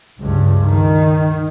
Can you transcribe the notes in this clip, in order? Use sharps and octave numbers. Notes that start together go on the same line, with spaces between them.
C#2 G2
D#3